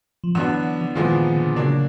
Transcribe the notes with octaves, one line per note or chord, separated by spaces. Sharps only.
F3
D3 E3 F#3 B3 D4
E3
A#2 D#3 F3 G#3 B3
D#3
D3
C#3 F#3 A#3 D4